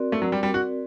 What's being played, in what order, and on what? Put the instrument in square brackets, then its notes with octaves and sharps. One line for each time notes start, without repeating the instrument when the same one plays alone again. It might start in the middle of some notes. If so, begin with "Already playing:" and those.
Already playing: [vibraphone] C4 F#4 A#4 D5
[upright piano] A3
F#3
G3
G3
F#4